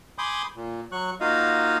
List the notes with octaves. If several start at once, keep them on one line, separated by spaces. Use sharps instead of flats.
G#5 B5 C6 D6 D#6 G6
A#2
F#3 C#6 F#6
A#3 D#4 F4 F#4 D#5 F5